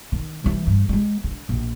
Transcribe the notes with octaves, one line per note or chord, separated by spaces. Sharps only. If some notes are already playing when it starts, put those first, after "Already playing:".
D#3
E3 G3
G2
G3 G#3
D3
A#1